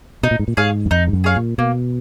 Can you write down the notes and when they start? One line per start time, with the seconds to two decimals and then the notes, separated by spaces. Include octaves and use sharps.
0.23 B2 D#4
0.31 A#2
0.39 G#2
0.48 A#2
0.57 G#2 G#4 C#5 F5
0.86 F#2
0.91 F2 D#4
1.07 G#2
1.13 F#2
1.24 G#4 C#5 F5
1.36 A#2
1.58 B2 A#3